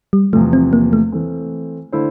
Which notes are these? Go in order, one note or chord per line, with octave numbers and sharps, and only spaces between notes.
G3
E2 C3 F3 A3
C4
A#3
A3
E3 A3 C4
D3 A3 E4 A4 C5